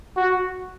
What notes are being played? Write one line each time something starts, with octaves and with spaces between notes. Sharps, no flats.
F#4